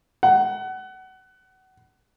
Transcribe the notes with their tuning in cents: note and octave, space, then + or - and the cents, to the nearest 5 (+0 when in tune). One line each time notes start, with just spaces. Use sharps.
F#5 +25